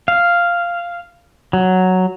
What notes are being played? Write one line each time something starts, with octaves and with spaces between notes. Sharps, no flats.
F5
F#3